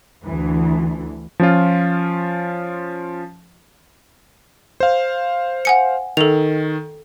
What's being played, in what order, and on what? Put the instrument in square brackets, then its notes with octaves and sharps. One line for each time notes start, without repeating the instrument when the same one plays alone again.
[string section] D2 E3
[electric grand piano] F3 C#4 F4
C5 F5
[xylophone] F#5 G#5 C#7
[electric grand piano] D#3 [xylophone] A4 F7